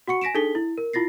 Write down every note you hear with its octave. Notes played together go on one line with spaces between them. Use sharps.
F#4 F#5 C#6 C#7
G#5 A#6 B6 D7 E7
D4 D#4 G#4 A4 B6 G7
E4
A#4
E4 F4 A6 A#6 C7